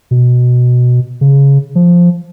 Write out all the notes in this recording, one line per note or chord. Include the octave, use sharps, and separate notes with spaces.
B2
C#3
F3